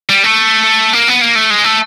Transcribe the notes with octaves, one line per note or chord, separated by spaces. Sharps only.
G3
A3
A#3
B3
A#3
A3
G#3
A3